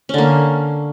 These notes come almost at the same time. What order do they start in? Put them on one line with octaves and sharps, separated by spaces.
C#4 D3 A#3